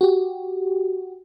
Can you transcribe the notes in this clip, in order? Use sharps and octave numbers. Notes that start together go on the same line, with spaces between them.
F#4 G4